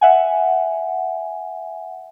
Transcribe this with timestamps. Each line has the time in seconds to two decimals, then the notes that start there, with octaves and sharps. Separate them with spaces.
0.01 E5 F#5 G#5